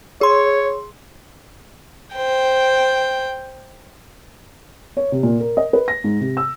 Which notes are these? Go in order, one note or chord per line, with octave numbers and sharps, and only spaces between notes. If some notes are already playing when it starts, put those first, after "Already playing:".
G#4 C#5 C6
C5 G5
C#5
C3
A#2
A#4
D#5
B4
A#6
G#2
C3
E6